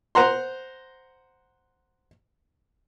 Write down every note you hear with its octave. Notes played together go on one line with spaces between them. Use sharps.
C5 F#5 A#5 C6